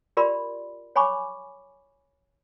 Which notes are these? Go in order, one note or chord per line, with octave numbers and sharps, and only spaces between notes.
F4 G4 A#4 D5 B5 C6
C#5 G#5 B5 C#6 D6